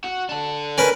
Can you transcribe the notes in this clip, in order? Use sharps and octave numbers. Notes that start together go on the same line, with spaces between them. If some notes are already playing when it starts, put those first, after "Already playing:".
F#4
D4 A4
C#4 A#4 B4